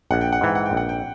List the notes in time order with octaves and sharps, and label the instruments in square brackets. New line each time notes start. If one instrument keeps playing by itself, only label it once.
[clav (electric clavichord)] A#1 [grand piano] F#5
[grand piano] G5
F#5
[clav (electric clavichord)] G#2 E3 [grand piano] G5
[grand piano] F#5
G5
[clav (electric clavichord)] A#1
[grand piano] F#5
G5